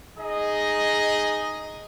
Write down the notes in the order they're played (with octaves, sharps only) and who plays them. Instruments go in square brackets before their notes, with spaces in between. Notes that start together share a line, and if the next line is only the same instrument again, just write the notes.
[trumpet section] D#4 G#4 D#5